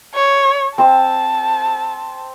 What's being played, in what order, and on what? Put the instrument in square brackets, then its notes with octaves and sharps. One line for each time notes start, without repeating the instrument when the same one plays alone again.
[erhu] C#5
[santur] C4 E6 [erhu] A5